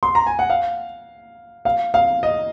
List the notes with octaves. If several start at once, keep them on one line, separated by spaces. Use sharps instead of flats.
C6
A#5
G#5
F#5
F5
F5
F5
D#5